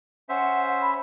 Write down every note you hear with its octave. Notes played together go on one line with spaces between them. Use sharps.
C#4 C5 E5 F#5
B5